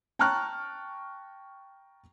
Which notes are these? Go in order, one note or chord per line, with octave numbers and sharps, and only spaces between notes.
G5 A5 A#5 C#6 F6 F#6